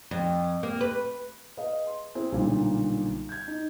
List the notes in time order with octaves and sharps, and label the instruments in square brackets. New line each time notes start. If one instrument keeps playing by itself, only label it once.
[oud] F2
A#3
B4
[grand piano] G#4 B4 D#5 F5
C6
C4 E4 G#4
B1 A#2 D3 G3
G6 G#6
D#4